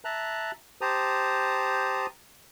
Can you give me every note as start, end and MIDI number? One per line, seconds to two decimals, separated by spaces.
0.05 0.51 76
0.05 0.51 81
0.05 0.51 82
0.05 0.51 90
0.81 2.06 67
0.81 2.06 72
0.81 2.06 81
0.81 2.06 82
0.81 2.06 87